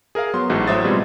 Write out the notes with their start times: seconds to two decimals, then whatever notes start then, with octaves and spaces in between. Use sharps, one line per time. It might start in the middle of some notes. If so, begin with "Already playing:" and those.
0.15 G#4 A#4 E5 F5
0.34 F#3 B3 C6
0.50 A1 G#2 F#4
0.68 A2 F#3 C5 E5 D#6 A6
0.84 B2 G3 G#3 C4 F4 G#4